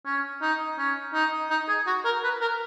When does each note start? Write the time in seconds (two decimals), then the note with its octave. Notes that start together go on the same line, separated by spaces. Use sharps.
0.05 C#4
0.42 D#4
0.78 C#4
1.14 D#4
1.50 D#4
1.68 G#4
1.87 F#4
2.05 A#4
2.23 B4
2.41 A#4